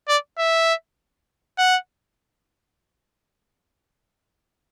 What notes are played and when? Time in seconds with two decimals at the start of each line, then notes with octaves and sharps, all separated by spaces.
0.08 D5
0.38 E5
1.58 F#5